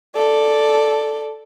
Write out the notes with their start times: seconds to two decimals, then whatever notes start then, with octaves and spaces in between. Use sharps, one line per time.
0.16 A4 D5